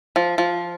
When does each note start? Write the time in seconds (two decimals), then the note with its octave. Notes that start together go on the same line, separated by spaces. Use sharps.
0.16 F3
0.38 F3